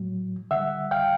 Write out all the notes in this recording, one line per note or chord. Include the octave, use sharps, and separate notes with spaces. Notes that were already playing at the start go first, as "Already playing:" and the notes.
Already playing: A2 F#3
D3 G3 E5 F#5
F5 G5